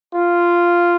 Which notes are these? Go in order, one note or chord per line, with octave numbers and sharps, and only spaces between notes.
F4